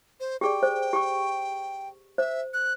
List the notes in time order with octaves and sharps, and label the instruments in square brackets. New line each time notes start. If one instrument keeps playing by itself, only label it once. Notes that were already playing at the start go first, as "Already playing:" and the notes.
[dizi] C5
[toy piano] G4 G#4 D5 [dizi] G5
[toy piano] C5
G4 C#6
[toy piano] C5 [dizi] E5
[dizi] F#6